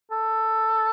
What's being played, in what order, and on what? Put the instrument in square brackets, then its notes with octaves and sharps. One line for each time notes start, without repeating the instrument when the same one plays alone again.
[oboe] A4